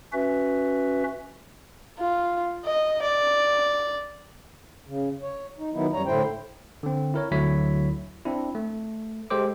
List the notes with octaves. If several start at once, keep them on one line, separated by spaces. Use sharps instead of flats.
C#4 F#4 B4 E5
F4
D#5
D5
C#3
C#5
D#4
D#3 F#3 B3 D#4 E4
F#2 G3 C#5 A#5
A2 D3 E4 C5 G5
D3 C4
E4 A#4 C#5
D2 D3 F#3 E4 C#5 B6
C4 D4 E4
A3
G#3 G4 A4 C5 D6